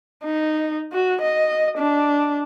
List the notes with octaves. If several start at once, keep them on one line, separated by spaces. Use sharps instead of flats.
D#4
F#4
D#5
D4